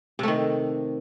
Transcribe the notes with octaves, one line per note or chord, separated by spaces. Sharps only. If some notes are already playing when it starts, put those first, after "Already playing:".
C3 D#3 A3